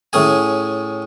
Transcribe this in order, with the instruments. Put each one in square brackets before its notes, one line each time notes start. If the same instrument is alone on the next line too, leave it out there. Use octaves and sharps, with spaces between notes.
[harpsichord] A2 C#4 G#4 G#5